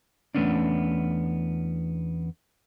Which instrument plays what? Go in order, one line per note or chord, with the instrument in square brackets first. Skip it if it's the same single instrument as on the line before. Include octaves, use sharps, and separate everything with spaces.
[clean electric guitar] E2 A3 B3 C#4 D4